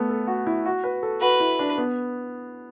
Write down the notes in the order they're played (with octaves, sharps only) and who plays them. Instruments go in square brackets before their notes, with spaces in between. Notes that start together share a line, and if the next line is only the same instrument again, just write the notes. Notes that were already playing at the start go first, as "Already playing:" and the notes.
Already playing: [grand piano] A3 B3
A4
F#4
E4
F#4
B4
A4
[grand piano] F#4 [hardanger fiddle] B4
[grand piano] E4
D4
B3